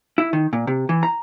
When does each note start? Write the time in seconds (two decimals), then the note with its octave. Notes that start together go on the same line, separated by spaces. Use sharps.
0.18 E4
0.33 D#3
0.53 A#2
0.67 C3
0.89 E3
1.03 A#5